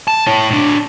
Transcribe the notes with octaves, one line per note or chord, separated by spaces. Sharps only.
A5
E4 C#5
A2 D4